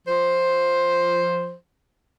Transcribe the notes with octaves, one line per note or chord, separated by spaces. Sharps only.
F3 C5